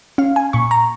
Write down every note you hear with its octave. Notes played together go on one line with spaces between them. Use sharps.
C#4 F5
G#5
A#2 C#6
A#5